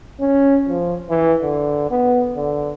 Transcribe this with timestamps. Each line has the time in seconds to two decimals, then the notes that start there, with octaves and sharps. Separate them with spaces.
0.20 C#4
0.68 F3
1.10 E3
1.42 D3
1.90 B3
2.36 D3